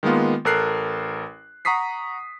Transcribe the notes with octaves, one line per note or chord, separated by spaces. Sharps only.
D#3 G#3 A#3 B3 F4
A1 A4 A#4 F#6 C7
F#5 A#5 C#6 D#6 B6 C7